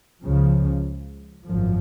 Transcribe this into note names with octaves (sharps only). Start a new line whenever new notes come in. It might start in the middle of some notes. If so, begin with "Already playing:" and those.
C#2 C#3 F3
G#1 F#2 F3